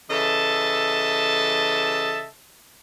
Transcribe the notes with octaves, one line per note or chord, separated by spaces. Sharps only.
C#3 E3 A4 D#5 E5 A5